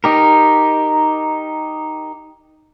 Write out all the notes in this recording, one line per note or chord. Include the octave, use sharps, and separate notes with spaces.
D#4 G4 A#4